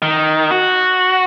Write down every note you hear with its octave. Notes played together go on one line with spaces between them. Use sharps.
D#3
F#4